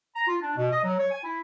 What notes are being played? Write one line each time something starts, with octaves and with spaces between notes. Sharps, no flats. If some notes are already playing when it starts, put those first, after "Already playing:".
A#5
F4
D4
B2
D#5
F#3
C#5
G#5
E4